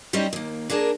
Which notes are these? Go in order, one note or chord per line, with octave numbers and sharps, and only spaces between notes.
G3 C4 C#4 D#4 E4 D#5
D#2 A#3
A#3 D4 G#4 A#4 A5